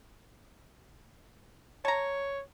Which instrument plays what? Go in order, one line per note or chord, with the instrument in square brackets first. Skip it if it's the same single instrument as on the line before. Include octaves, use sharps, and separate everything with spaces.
[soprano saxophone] C#5 [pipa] A5 A#5